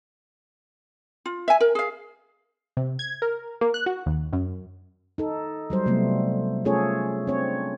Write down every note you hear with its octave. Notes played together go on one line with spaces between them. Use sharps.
F4
E5 G#5
A#4
G#4 F5
C3
G#6
A#4
A#3
F#6
F#4
D#2
F#2
D#4 A4
F#3 G3 C5
C3 F#3 G3 A3 B3
A3 C#4 F4 G#4 A4 C#5
C4 D4 C#5